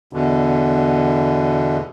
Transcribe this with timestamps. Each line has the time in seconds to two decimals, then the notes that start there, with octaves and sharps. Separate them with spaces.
0.13 E2 B2 D3